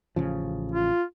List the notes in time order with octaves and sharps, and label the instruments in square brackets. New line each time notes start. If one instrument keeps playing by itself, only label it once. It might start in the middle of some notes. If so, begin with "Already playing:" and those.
[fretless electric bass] A1 C#3 F3
[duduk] F4